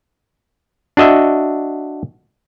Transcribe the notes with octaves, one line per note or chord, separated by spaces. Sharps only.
D4 F#4 D#5 E5